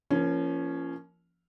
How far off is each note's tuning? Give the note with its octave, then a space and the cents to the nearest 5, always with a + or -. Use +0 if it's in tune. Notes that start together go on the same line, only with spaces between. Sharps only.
F3 -30 A#3 +0 C#4 +0